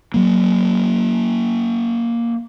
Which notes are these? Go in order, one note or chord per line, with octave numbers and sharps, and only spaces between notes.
F#3 A#3